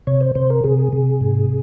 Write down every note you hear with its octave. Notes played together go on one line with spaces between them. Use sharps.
C3 C#5
C5
C3 C5
A#4
C3 G#4
C3
G#2